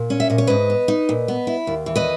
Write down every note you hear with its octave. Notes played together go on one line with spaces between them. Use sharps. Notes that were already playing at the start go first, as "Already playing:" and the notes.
Already playing: A#2
C#4
E5
A#2 D#5
C#5
G#2 B4 D#5
B3
D#4
A#2
B3
E4
D#2
E3
B4 D#5